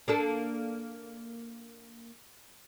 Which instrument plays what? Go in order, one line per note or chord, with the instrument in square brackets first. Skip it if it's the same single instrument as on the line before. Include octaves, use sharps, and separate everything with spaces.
[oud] A#3 D4 A4